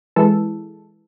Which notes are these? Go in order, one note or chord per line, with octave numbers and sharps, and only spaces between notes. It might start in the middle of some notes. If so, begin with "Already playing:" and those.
E3 G#3 A4